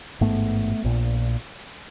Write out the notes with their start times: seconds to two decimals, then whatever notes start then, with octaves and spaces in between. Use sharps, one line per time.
0.21 A1 G#2 A3 B3
0.84 A#1 A#2